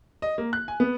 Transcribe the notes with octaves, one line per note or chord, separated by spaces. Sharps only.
D#5
A#3
F#6
G#5
B3